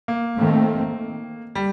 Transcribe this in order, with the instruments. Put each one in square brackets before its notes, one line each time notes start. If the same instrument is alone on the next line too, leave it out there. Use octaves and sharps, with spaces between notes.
[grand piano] A#3
[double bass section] D#3 A3 C4
[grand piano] G3